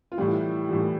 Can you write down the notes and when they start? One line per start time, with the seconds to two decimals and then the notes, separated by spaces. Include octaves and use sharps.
0.12 F4
0.18 A2 E3 G3 E4
0.69 A2 E3 G3